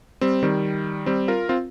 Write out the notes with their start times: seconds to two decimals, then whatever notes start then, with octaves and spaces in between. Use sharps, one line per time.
0.21 G3 C4
0.43 D#3 G3
1.06 G3 C4
1.28 F4 A#4
1.49 C4 F4